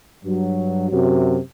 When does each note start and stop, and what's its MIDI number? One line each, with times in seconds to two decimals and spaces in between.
0.25 0.89 43
0.25 0.89 54
0.90 1.39 42
0.90 1.39 48
0.90 1.39 54